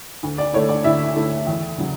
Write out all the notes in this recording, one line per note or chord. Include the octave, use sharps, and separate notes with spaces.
D2
D5
D3 A3 E4 C#5
D5
D2 E4 E5
D3 A3 E4
E2
C#3 F#3